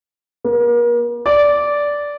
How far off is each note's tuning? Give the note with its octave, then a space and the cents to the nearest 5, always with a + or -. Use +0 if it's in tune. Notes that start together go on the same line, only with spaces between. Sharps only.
A#3 +40
D5 -10